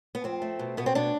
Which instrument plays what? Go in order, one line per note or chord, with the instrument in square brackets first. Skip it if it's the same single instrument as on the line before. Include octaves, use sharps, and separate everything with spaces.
[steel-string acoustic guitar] B3
F2 C4
A3
B2
B2 B3
C4
B2 D4